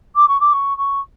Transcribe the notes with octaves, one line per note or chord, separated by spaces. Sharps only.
D6
C#6
D6
C#6
C#6